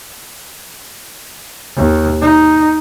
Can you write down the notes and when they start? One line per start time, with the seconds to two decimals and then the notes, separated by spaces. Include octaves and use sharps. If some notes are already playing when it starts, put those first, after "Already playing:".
1.76 D#2
2.22 D#4